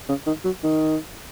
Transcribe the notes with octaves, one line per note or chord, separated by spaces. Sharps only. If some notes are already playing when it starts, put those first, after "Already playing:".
C#3
D#3
F#3
D#3